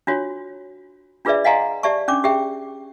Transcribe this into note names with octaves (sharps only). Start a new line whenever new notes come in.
D4 F4 F#4 C#5
D4 F4 G#4 B4 D5 E5
D#5 F5 F#5 G#5 A#5 C6
G4 D5 E5 A5 C#6
C#4 D4 D6
G4 G#4 E5 G5